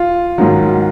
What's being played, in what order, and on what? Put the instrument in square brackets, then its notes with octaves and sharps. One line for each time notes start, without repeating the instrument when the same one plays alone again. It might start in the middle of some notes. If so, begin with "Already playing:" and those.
Already playing: [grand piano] F4
[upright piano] G#2 D#3 F#3